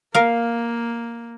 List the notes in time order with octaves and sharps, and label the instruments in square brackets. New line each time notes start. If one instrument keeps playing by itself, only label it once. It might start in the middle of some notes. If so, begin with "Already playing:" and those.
[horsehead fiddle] A#3 [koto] A#4 F5